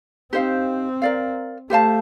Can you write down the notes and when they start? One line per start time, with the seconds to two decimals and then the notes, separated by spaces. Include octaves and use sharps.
0.33 C4 D#4 G4 C5 F5
1.02 A#4 D5 F5
1.70 A3 G4 C5 F5 A5